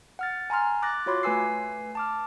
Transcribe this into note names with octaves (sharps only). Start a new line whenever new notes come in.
F#5 F6 A6
G#5 A#5 C6 F6
D6 F#6 A6 A#6
F4 F#4 C#5 B5 C6 D6
A3 B4 G#5 E6 C7
A5 D6 F6